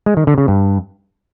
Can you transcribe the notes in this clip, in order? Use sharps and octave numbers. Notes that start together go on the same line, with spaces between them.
G#3
D#3
D3
C#3
G2